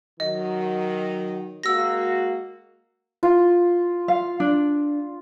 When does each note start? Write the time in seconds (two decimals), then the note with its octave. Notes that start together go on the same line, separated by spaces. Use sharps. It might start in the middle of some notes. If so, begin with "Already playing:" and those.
0.20 D#3 F#3 D#5
1.63 G#3 A#3 F#4 E6 A#6
3.23 F4
4.08 F5
4.40 D4